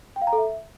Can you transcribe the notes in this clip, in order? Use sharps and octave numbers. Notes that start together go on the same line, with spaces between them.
G5
F5
A#5
A4
E5